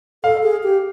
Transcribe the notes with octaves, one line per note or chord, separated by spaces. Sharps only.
A4 F5
G#4
G4